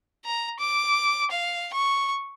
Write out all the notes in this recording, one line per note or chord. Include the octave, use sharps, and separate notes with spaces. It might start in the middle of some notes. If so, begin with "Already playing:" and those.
A#5
D6
F5
C#6